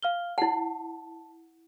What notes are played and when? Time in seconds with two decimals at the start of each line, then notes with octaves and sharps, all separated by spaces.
0.03 F5 F6 G7
0.38 E4 F#5 A5